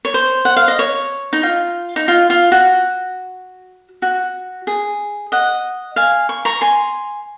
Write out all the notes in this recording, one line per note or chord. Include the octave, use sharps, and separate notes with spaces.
C#5
C5
F#5
F5
D#5
C#5
D#4
F4
D#4
F4
F4
F#4
F#4
G#4
D#5 F#5
F5 G#5
C#6
A#5 C#6
G#5 C6